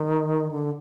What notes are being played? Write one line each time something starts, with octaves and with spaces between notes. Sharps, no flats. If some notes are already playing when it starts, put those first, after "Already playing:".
Already playing: D#3
D3